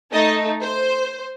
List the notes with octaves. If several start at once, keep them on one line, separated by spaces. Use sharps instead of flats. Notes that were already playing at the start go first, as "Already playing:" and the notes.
A3 D#4 A4 D#5
C5